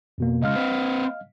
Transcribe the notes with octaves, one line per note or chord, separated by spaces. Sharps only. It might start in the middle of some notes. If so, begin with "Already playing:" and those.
F2 B2 A#3
C#3 G#3 D#5 F5 F6
C4 B4